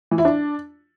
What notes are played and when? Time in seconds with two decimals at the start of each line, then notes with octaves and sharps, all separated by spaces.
0.11 E3
0.18 E4
0.25 D4